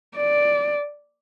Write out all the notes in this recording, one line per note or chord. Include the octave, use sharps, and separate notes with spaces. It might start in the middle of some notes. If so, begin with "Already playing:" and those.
D5